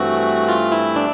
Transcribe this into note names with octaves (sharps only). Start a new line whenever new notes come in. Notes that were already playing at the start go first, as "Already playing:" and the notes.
Already playing: G2 E3 A3 C4 F#4
F4
E4
D4